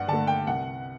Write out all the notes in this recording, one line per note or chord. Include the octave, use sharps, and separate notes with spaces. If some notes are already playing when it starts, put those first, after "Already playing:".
Already playing: G2 D5 F#5
D3 A3 A5
G5
C2 F#5